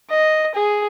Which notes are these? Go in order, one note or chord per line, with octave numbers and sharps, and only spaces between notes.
D#5
G#4